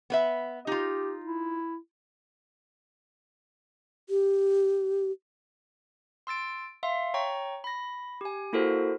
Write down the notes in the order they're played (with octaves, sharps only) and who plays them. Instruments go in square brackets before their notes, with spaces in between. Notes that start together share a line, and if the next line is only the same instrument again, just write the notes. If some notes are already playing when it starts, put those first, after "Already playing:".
[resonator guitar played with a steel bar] B3 B4 E5
[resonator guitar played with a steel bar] D#4 F4 [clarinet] G4
[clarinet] E4
[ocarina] G4
[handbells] C6 E6 A6 D7
E5 F5 C6
C#5 G5 A#5 C#6
B5 A#6
G4 G#5
A#3 E4 F#4 A4 A#4 C5